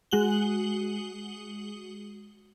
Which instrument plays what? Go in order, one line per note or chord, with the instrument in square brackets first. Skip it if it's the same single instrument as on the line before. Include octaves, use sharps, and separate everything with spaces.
[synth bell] G#3 F#4 F#7 G7